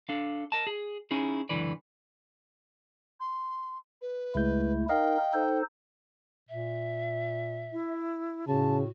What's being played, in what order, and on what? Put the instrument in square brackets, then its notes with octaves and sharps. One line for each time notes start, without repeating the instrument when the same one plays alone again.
[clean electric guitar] D4 A4 F5
A#4 D#5 A5
G#4
C#4 D#4 E4 G#4
C#2 F#2 D3 E3 B4 D5
[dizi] C6
B4
[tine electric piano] C#2 G#3 G6 [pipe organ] A3 E4
[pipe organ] D#4 A#4 [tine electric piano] D#5 F5 [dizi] G5
[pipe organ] D#4 A4 C5
[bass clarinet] A#2 [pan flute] E5
[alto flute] E4
[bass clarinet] A2 [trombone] C#3 [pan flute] F#4 [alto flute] A5